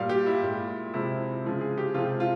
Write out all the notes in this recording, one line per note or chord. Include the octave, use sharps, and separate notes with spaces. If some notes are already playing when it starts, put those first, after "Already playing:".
Already playing: A#2 G3 F5
G4
E4
A#2 G#3
C3 F3 G#3 E4
C#3 F3 G#3
G#4
G4
C3 F3 G#3 F4
F4